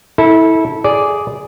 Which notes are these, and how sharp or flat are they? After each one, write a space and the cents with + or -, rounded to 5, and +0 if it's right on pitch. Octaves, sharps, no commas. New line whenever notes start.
E4 -25 A4 +0
G#4 +0 D5 -10